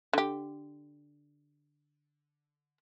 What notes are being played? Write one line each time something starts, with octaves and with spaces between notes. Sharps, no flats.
D3 G4